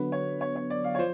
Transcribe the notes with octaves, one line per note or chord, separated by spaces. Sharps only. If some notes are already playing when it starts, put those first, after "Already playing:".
Already playing: D3 F#3 B3 B4
C#5
C#5
C#5
D5
F5
C#5
F3 C5